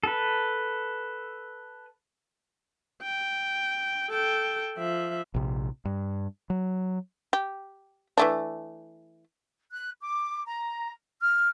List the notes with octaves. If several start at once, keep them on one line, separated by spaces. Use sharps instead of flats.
A4 B4
G5
A4 G5
F3 E5
A#1 C3
G2
F#3
G4
E3 A3 D4
F#6
D6
A#5
F6